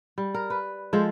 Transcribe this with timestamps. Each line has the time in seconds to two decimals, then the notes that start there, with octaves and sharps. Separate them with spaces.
0.18 G3
0.34 A#4
0.50 B4
0.93 F3 G#3 A4 C5